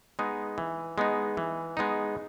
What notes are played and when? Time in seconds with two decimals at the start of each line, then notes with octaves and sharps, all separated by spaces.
0.19 G#3 B3 D#4
0.58 E3
0.98 G#3 B3 D#4
1.37 E3
1.77 G#3 B3 D#4